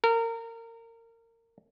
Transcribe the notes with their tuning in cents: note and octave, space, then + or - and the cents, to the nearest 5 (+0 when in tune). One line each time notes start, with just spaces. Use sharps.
A#4 -25